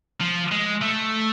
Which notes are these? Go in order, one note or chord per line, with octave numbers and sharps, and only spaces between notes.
F3
G#3
A3